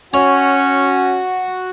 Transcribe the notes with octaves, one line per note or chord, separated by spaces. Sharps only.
C#4 F#4 C#5 F#5